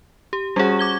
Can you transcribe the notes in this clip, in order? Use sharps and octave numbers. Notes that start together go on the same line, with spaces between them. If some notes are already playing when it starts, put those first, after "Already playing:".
G4
G3 C#4 F#4 G#4
D6 G#6 G7